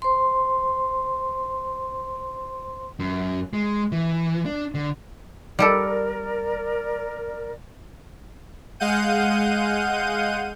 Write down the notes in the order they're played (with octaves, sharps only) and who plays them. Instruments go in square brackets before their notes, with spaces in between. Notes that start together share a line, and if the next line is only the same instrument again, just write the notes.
[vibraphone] C5 C6
[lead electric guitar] F#2
G#3
E3
D4
D3
[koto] G3 G4 A4 [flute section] A#4 D5
[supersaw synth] G#3 F5 F#5 G6 D#7